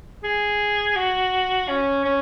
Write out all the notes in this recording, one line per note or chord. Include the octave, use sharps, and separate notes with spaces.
G#4
F#4
C#4
C#4